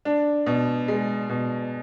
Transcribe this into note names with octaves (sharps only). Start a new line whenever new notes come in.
D4
B2
G#3
B2